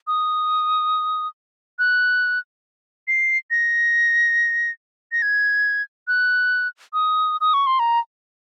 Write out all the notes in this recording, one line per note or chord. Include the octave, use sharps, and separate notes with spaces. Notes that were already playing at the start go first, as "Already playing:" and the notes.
D#6
F#6
C7
A#6
A#6
G#6
F#6
D#6
D#6
C#6
C6
A#5